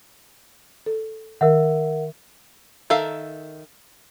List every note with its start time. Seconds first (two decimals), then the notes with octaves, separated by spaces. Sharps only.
0.86 A4
1.41 D#3 A#4 E5 F#5
2.90 D#3 A4 E5 F5